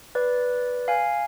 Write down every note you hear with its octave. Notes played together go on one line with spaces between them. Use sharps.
B4 D5
F5 G#5